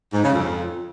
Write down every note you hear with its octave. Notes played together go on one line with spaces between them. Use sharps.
G#2
C#3
F2